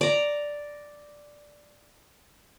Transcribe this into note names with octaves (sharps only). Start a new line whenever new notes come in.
D5 A#5